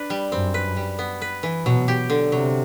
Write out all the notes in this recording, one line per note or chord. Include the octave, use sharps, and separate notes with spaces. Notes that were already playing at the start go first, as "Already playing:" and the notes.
Already playing: D4 B4
G3
F#2 C4
B4
G3
B3
B4
E3
B2 F#3
G4
D3
C3 F#3